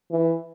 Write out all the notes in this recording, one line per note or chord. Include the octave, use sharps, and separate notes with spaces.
E3